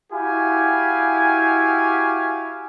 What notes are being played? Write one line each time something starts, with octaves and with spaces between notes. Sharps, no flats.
E4 F#4 G4 F5 G#5